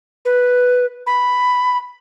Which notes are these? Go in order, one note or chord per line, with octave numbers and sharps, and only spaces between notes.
B4
B5